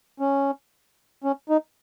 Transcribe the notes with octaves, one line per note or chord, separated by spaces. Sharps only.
C#4
C#4
D#4